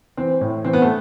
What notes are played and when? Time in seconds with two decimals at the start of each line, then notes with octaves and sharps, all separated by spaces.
0.17 E3 C4
0.41 A2
0.65 E3 C4
0.73 B3
0.82 A3